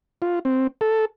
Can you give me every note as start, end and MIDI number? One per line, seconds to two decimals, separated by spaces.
0.22 0.39 65
0.45 0.67 60
0.81 1.05 69